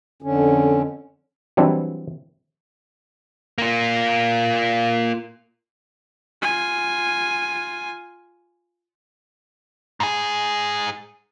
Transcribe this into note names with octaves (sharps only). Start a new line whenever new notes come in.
F2 D3 C#4
E3 F#3 G3 C4 D4 E4
A#3 F4
F4 G#5
G#2 G#4